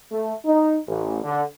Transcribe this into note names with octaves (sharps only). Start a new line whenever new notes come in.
A3
D#4
A1
D3